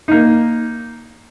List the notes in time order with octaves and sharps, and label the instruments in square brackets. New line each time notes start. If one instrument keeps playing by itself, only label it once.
[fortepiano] A#3 D#4